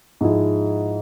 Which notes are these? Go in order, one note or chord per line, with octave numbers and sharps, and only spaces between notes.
G#2 F3 G#3 E4 G#4